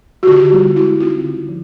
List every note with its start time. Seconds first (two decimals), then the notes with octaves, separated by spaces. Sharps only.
0.23 F#4
0.27 D3 F4 G4
0.52 G3 B3 E4
0.76 G#3 E4 F#4
1.00 C4 D#4 F4
1.24 D3
1.49 F3